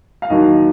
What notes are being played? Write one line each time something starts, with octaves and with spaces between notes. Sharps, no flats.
F5
D#2 D#3 F#3 D#5